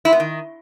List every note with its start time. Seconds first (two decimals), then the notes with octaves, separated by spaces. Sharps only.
0.05 E4
0.12 B3
0.20 D#3